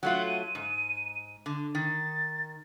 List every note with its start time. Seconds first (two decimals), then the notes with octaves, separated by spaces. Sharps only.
0.03 F#3 A3 F4 F#5
0.28 D#7
0.55 G#2
1.46 D3
1.75 D#3 A6